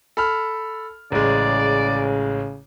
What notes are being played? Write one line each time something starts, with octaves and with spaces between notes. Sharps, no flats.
A4 B5 F6
A1 C#3 G#3 D5